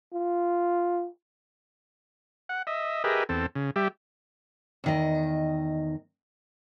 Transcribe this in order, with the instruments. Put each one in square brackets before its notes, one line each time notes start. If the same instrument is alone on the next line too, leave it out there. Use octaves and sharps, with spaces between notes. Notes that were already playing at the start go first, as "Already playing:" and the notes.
[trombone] F4
[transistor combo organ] F#5
D#5 E5
G4 G#4 A#4 B4 D#5 E5
E2 C4 A4
C#3
G3 G4 E5
[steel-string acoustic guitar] E2 D#3 D#5